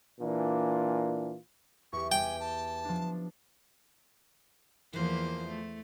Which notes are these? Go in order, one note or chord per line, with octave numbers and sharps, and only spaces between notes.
A#2 E3 A#3 D4 F4
E2 G4 C#6
G5 G#5
A5
F3 D4
E2 E3 F3 A#3 C5
A3